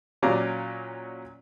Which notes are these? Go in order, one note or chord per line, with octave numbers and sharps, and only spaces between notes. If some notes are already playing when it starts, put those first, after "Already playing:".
A#2 F#3 C#4 D5 F5 A#5